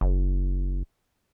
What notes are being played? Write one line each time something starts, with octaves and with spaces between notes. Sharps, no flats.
F#1